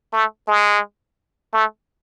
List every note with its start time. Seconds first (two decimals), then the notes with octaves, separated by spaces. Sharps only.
0.13 A3
0.48 G#3
1.54 A3